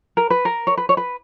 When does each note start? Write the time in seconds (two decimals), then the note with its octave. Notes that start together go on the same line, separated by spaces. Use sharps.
0.17 A#4
0.30 B4
0.45 A#4
0.67 C#5
0.77 B4
0.89 C#5
0.97 B4